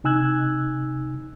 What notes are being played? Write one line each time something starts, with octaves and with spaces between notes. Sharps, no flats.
C3 D#4 G#5 E6 F#6 G#6